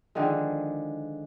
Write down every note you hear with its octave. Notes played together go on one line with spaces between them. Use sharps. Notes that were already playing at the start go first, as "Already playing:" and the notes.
D3 D#3 F3 G#3